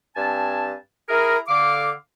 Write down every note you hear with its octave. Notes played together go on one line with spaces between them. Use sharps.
G2 C4 G#5 A5
E4 G#4 A#4
D3 F5 D6